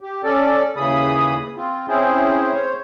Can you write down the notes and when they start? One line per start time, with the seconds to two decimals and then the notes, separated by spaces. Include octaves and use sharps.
0.01 G4
0.24 C#4 A4 D5
0.77 D#2 C#3 E3 G#4 B5 D#6
1.56 C4 F4
1.88 C4 C#4 E4 G#4 C5
2.53 C5 C#5